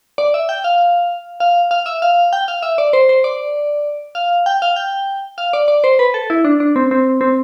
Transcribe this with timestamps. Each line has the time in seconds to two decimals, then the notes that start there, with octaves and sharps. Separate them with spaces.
0.18 D5
0.34 E5
0.49 G5
0.64 F5
1.40 F5
1.71 F5
1.86 E5
2.02 F5
2.33 G5
2.48 F5
2.63 E5
2.78 D5
2.93 C5
3.09 C5
3.24 D5
4.15 F5
4.46 G5
4.62 F5
4.76 G5
5.38 F5
5.53 D5
5.68 D5
5.84 C5
5.99 B4
6.14 A4
6.30 E4
6.45 D4
6.60 D4
6.76 C4
6.91 C4
7.21 C4